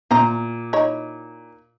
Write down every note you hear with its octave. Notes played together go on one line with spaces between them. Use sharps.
A#2 E3 C5 A#5
D#4 E4 C#5